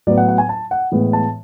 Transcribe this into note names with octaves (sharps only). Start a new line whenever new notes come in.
A2 F#3 B3 D5
F#5
F#5
G#5
A5
F#5
A2 E3 G#3 B3
A5